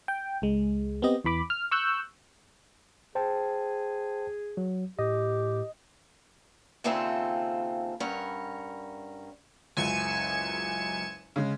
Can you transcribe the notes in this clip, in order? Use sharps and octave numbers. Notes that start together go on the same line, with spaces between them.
G5
C#2 G#3
B3 C4 G4 D#5
E2 E3 B5 D6
F6
C#6 E6 F#6 G6
G#4 C5 G5 A5
F#3
A2 G4 D#5
D#2 C#3 C4 F4 A4 E5
G2 C#4 A#4 F#5
F#1 C#2 F#2 G#5 C#7 E7
C#3 G#3